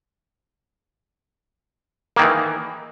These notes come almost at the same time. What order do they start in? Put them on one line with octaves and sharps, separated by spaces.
A#3 D#3 E3